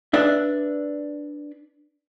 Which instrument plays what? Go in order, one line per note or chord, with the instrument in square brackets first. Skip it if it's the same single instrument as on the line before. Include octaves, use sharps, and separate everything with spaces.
[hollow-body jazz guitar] D4 B4 D5 E5